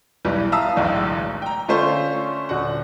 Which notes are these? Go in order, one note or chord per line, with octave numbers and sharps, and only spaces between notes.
B1 E2 E3 G3
E5 F5 A5 A#5 D#6 E6
E1 B1 E2 A2 D3
G5 A#5
D3 A3 C#4 F4 C5
D#1 D3 F#4 F#5